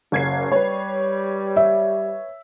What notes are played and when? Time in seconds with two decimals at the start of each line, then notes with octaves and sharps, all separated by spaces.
0.12 F#1 F#3 A#3 C#4 G#6 C7
0.52 G3 B4 C#5
1.56 E5